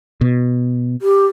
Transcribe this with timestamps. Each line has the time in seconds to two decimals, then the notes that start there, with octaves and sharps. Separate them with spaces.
0.21 B2
1.02 G4